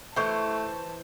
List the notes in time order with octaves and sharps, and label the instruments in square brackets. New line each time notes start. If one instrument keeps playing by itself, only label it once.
[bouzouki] E3 C5 [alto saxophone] A3 [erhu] A5 [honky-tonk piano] C#6 G6